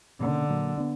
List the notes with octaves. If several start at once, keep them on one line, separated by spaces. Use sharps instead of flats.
B2 D3 G3 A#3 C#4
A#2 F#3 A#3
B3 D4